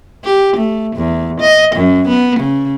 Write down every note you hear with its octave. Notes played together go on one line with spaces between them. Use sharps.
G4
A3
E2
D#5
F#2
B3
C#3